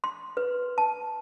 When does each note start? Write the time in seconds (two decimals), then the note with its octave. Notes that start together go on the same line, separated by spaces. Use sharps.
0.04 C6
0.37 B4
0.78 A5